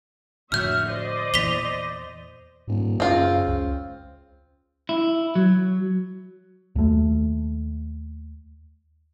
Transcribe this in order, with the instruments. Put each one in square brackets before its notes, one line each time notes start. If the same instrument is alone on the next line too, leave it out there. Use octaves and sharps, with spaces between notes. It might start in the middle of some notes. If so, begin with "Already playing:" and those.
[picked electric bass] F2 A2 D3 [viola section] F#4 C#5 E5 [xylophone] F6 G6
[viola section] C5 D5 D#5
[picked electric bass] E2 A#2 E3 [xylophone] B6 F7 G7
[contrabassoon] D#1 [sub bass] G#2
[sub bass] F#2 [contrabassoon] C#3 [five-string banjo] C4 F4
[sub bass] C#2
[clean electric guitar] E4
F#3
[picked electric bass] D#2 A3